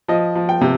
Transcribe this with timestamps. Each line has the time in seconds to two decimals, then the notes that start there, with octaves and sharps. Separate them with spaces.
0.08 F3 D#5
0.35 F3
0.49 G5
0.61 C3